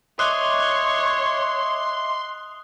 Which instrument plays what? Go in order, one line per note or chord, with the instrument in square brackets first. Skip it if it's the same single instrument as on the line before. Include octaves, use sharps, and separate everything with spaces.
[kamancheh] C#5 [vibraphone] D#5 E5 D6 [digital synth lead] C6 [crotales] D#6 F#6 G7